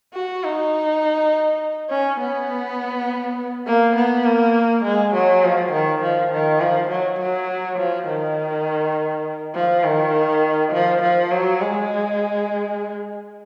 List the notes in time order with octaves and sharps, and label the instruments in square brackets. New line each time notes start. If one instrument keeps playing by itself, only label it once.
[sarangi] F#4
D#4
C#4
B3
A#3
B3
A#3
G#3
F#3
F3
D#3
F3
D#3
F3
F#3
F#3
F3
D#3
F3
D#3
F3
F3
F#3
G#3